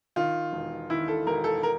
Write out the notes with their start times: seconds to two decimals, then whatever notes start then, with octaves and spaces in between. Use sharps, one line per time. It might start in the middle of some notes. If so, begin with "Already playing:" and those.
0.16 D#3 F4
0.53 E1
0.90 D#3 E4
1.08 A4
1.27 E1 A#4
1.44 A4
1.63 A#4